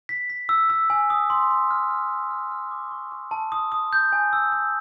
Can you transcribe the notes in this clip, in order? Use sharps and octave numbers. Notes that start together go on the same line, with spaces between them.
B6
B6
E6
E6
G#5
D#6
C6
C6
F6
F6
F6
F6
F6
D6
C#6
C#6
A5
D#6
D#6
G6
G#5
E6
E6